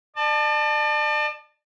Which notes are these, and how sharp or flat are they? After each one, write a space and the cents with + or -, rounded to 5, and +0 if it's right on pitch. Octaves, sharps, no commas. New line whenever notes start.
D5 +40 A5 +0